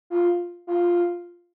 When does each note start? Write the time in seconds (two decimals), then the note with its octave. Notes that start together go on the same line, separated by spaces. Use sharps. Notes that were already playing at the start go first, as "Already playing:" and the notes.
0.10 F4
0.67 F4